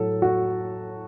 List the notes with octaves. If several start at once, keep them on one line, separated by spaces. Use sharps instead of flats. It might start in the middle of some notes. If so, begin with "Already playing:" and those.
Already playing: A2 F#3 A4
F#4